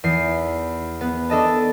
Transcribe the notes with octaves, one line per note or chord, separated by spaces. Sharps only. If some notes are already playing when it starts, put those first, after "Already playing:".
E2 C7
B3
D4 A4 D#5 A5